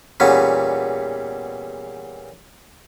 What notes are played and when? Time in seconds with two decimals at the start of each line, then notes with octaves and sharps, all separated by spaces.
0.20 E2 A#2 G3 B3 C#4